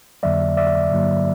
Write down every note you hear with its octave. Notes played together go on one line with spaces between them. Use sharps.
F2 D3 F#3 A#3 D5 E5
D5 E5
G2 D3 F#3 A#3